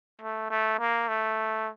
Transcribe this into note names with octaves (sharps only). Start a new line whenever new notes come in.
A3
A3
A#3
A3